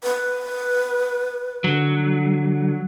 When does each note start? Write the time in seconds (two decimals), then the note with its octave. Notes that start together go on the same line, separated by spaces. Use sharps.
0.03 B4
1.64 D3 F#3